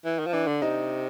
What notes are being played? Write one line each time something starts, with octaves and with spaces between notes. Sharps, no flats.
E3
D#3
F3
E3 D4
D3
C3 D#4